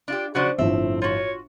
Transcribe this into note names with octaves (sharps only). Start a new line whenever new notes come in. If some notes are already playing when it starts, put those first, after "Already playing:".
D4 F4 G4
C#3 F3 D4 F#4 C5 D5 C#6
G1 A2 F3 C4 E5
F4 F#4 C#5